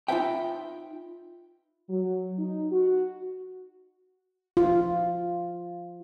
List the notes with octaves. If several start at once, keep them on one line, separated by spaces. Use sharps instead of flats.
D#4 F4 G#4 B4 E5 G5
F#3
D#4
F#4
F4